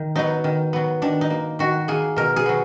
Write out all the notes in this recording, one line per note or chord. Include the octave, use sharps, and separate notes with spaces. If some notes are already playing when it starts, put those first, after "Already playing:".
Already playing: D#3
F#3 B3 D#4
D#3
F#3 B3
D#3 D4
D#4
A#3
D#3 F#4
A#3 G#4
B2 A#4
G#4
F#3 B3